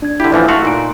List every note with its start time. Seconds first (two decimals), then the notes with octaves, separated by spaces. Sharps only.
0.02 D4 G#6
0.20 D3 E4 G4
0.32 A1 E3 F3
0.48 A3 F#4 F5 C6
0.65 A#2 D#4 D7